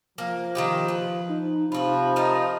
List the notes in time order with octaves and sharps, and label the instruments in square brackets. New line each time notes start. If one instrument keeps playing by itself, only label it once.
[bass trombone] F3 [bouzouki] A#3
[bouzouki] D#3 E4 G4
B4
[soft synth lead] D#4
[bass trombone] C3 [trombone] F3 [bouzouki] F4 F#4 [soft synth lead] B5
[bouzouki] D#4 F4 A#4